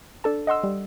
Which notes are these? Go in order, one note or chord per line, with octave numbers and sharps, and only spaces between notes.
D4 A4 A5
D#5 F#5 C6 E6
G3